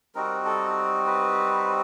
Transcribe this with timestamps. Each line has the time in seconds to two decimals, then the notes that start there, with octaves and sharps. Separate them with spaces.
0.15 G3 C4 D#4 F#4 A#4
0.45 A4
1.07 B4